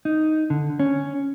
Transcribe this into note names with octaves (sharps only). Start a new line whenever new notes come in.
D#4
D3
C#4